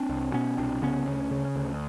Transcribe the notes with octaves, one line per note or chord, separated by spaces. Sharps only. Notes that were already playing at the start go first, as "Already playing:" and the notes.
Already playing: C4 D4
C2
B2 B3 C#4
C2 C4 D4
C#3 B3 C#4
D2
C#3
D2